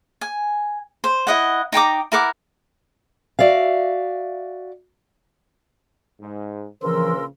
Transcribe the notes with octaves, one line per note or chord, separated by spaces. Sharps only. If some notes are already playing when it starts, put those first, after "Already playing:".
G#5
C5
E4 D#5 F#5
D#4 G5 A#5 D6
E4 A#4 F#5 D6
F#4 D5 E5 F5
G#2
A#1 C#3 E3 F3 A#4 C6 E6